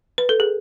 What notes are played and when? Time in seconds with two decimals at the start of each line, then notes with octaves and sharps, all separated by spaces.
0.18 B4
0.29 A4
0.40 G#4